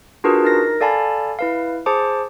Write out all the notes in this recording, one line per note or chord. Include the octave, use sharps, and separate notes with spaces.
D4 F4 F#4 G#4 A#4 B4
D#4 A#4 A#6
A4 D5 F5 G#5 A5 B5
E4 B4 F5
G#4 C5 A5 D6